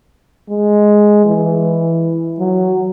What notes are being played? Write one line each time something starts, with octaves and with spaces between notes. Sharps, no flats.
G#3
E3
F#3